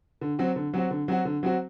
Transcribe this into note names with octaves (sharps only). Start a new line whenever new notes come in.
D3
F#3 C4 F#4
D3
F#3 C4 F#4
D3
F#3 C4 F#4
D3
F#3 C4 F#4